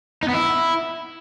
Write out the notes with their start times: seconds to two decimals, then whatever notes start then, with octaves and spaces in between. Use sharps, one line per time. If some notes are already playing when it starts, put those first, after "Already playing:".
0.23 D#4
0.29 B3
0.34 E4